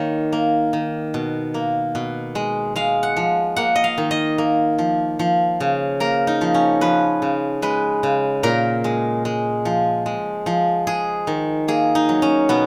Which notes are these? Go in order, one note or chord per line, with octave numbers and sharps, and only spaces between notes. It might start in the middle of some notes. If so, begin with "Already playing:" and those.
Already playing: D#3 A#3 C#5
A#3
D#3
B2
A#3
B2
G#3
G#3 F5
F#5
F3
A#3 F#5
D#5
F5
D#3
D#5
A#3
F3
F3
C#3
A#3 A#4
D#4
F3
C#4
F3 B4
C#3
G#3 B4
C#3
A#2 A#4
G#3
G#3
F3
G#3
F3
G#3 G#4
D#3
A#3 G#4
D#4
F#3
C#4
B2 B3